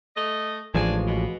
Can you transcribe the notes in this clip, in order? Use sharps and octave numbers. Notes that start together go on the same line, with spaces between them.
A3 D#5
A1 F3 G#3 D4 G#5
B2